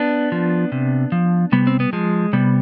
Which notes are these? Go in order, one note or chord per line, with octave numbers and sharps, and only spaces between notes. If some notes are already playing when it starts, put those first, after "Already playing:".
Already playing: B3 D4
F3
C3
F3
C3 G3 B3
C4
B3
F3 G#3
C3 G3 B3